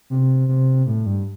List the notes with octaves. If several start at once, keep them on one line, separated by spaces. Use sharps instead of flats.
C3
C3
A2
G2